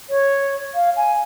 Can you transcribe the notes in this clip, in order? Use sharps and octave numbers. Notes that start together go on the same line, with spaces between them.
C#5
F5
G#5